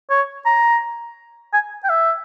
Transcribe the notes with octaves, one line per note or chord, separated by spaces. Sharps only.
C#5
A#5
G#5
G5
E5